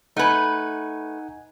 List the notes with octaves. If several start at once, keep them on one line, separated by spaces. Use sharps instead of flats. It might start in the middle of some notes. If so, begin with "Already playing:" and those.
A3 D#4 B4 F#5 G#5